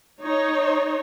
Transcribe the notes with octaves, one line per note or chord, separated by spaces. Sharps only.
D#4 C#5